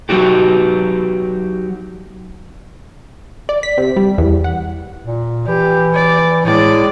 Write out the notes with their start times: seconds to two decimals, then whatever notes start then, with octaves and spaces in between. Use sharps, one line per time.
0.09 F#3 D#4 F#4 G4
3.49 D5
3.63 B6
3.78 C3
3.96 G3
4.18 E2
4.44 F#5
5.04 A#2
5.47 E3 G4
5.94 D5
6.45 A2 G#3 D5